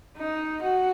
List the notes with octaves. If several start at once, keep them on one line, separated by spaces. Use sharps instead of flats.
D#4
F#4